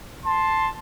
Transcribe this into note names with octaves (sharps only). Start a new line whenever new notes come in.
A5 C6